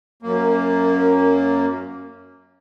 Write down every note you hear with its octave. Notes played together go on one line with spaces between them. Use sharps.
F#2 A#3